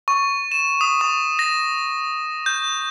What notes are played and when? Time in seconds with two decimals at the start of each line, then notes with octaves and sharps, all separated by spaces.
0.08 C#6
0.52 E7
0.81 D#6
1.01 C#6
1.39 A#6
2.46 G6